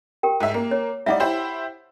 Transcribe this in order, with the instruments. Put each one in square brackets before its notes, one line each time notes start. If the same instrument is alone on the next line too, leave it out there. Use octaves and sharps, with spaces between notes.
[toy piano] G4 A#4 G5
[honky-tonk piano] G#2 E5
A#3
[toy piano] C#5
[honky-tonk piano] G3 D#4 D5 [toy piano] E5 F#5
[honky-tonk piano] E4 G4 C5